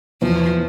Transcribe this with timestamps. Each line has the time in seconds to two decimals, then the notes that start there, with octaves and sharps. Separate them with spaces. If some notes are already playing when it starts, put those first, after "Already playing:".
0.22 E2 F3